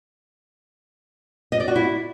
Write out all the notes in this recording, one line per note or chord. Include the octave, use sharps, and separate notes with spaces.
D#5
D5
F#4
E4